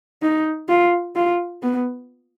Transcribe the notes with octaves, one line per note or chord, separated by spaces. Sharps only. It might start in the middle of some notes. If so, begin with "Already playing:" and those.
D#4
F4
F4
B3